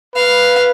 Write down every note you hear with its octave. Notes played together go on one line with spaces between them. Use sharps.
B4 F5